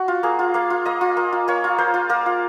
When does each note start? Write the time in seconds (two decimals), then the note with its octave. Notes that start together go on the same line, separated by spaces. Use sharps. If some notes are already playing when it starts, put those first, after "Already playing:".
Already playing: F#4
0.08 F4
0.23 A#3 G#4
0.39 F4
0.54 A#3 F5
0.70 F4
0.85 A#3 D#5
1.01 F4
1.17 A#3
1.32 F4
1.48 A#3 C#5
1.64 F4
1.78 A#3 C5
1.94 F4
2.09 A#3 A#4
2.26 F4